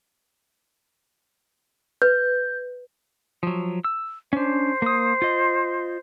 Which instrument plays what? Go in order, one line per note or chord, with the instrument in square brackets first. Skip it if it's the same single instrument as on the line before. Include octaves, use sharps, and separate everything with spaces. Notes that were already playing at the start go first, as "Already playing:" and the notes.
[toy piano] B4 [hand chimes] G6
[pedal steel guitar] F3 F#3
E6
[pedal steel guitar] C#4 D4 [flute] C5
[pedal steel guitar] A#3 D#6
F4 D#5